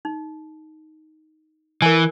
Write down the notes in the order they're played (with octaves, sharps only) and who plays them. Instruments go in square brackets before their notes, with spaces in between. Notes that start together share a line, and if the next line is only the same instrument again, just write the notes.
[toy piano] D#4
[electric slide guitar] E3 [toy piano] A#4 G#5